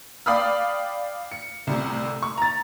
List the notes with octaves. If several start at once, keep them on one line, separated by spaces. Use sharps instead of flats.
D5 F5 G5 B5 D#6 F6
C#7
C2 A2 C3
C#6
A#5 A6